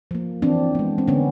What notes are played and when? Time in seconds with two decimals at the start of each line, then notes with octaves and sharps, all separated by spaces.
0.11 F3 A#3
0.42 E3 C4 D4
0.75 G#3 B3
0.98 C4
1.08 D3 B3 C#4